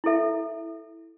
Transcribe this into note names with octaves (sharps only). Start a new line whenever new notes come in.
E4 A4 E5